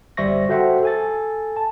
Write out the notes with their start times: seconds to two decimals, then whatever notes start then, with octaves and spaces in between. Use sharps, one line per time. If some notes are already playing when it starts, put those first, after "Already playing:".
0.17 G1 G3 C5 E5 C#6 A#6
0.49 F#4 A4 C5 E5 F#5 G5
0.83 A4 G#5 A6
1.57 A5